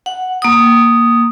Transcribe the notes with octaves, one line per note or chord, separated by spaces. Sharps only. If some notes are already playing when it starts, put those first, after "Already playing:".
F#5
A#3 D#6